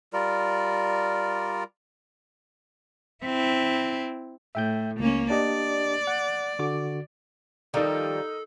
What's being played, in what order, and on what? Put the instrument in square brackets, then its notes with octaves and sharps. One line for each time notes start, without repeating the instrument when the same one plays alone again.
[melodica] G3 F4 A#4 D5
[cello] C4 E4
[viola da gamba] A2 [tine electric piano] E5 G5 G6
[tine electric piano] C#2 [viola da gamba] A#3 C#4
[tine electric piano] D4 G4 D#5 [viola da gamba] D5
[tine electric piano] F#5
D3 F#4 D6
[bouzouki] D#3 F3 G3 [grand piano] D#4 A#4 [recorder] A4